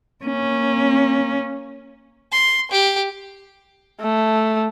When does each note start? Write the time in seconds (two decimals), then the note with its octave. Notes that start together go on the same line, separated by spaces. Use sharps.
0.25 A#3 C#4
2.32 C6
2.71 G4
4.01 A3